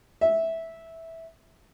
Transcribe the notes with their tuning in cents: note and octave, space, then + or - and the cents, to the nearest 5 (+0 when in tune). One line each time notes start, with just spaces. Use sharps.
E5 -10